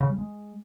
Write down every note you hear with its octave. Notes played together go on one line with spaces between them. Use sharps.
C#3
G3
G#3